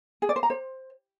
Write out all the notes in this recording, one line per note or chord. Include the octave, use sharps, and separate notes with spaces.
G#4
D5
C5
A#5
C5